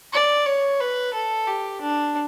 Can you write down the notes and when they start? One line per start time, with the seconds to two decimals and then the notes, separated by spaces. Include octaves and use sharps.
0.13 D5
0.46 C#5
0.80 B4
1.14 A4
1.47 G4
1.81 D4